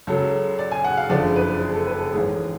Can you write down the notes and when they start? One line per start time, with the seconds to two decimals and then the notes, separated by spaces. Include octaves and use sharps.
0.07 C#2 C#3 F#3 A4
0.59 D5
0.72 G#5
0.84 F#5
0.97 F5
1.10 F#1 F2 D3 F3 G#3 D5
1.36 B4
1.61 G#4
1.74 A4
1.87 B4
1.99 A4
2.12 A1 G#2 G#3 G#4